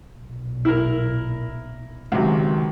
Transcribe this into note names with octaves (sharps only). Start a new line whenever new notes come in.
B1 A#2
E4 A#4
C#2 C3 D#3 F#3